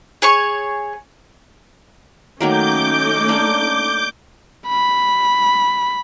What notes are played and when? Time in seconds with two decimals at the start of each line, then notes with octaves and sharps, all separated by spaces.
0.22 G#4 C#5 C#6
2.41 D#3 F#3 A3 A#3 C#4 D#4 D6 G6
3.29 A#3 D4
4.69 B5